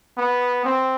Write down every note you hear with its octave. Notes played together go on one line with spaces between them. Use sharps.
B3
C4